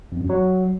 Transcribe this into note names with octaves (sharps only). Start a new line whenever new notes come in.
F2
F#2
F#3